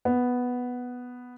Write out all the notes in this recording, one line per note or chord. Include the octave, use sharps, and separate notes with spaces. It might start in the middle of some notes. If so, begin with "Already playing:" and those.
B3